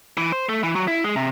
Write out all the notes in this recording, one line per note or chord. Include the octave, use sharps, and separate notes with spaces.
E3
C5
A3
E3
F#3
E4
G#3
C3